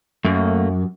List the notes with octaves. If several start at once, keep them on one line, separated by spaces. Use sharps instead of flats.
F#2 A3 A#3